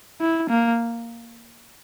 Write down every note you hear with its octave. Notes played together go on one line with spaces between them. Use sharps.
E4
A#3